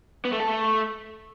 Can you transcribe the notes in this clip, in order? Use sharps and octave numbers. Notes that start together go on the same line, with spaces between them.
B3
A3
A4
A3